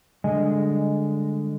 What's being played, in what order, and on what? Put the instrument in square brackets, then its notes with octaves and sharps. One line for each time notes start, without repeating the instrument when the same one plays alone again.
[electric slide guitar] D3 G3 G#3 D#5 G#5